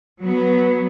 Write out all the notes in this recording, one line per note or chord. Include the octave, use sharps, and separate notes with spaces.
F#3 B3